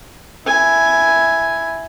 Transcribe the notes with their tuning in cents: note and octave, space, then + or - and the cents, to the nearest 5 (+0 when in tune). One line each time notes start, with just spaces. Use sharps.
E4 +0 G#5 +0